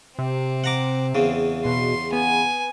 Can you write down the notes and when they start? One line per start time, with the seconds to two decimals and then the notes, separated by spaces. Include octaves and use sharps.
0.19 C3 C4
0.64 F#5 A#5 D6
1.15 E2 C#3
1.65 B2 C6
2.13 B3 G#5